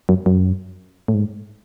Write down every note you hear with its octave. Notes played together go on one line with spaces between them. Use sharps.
F#2
F#2
A2
G#2